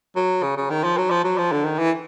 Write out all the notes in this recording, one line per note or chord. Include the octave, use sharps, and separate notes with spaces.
F#3
C#3
C#3
D#3
F3
F#3
F3
F#3
F3
D3
D#3
E3